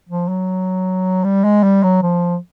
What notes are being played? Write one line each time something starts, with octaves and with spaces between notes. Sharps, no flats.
F3
F#3
G3
G#3
G3
F#3
F3